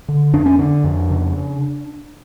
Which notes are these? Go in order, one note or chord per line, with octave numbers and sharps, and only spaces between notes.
D3
F2 D4
C#4
D3 D4
F2
C#3